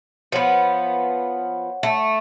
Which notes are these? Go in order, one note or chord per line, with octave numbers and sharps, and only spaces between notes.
F3 B3 C#5 F#5
A3